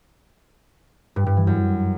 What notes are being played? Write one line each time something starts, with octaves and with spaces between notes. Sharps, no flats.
G2
G2
E3
F#2